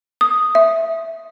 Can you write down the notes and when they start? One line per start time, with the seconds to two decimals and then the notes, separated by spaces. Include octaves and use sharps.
0.21 D#6
0.55 E5